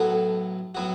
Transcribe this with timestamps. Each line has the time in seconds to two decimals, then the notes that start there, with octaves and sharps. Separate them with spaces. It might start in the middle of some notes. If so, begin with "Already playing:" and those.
Already playing: B1 A2 F#3 B3 F#4 A4
0.75 A2 F#3 B3 F#4